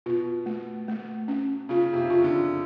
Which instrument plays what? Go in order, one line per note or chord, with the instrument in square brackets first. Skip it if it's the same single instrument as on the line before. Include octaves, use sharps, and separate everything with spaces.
[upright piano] B2 [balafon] F4
[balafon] A3
A3
C#4
[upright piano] C#3 [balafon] F4
[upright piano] C3
C#3
[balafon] F4
[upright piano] D3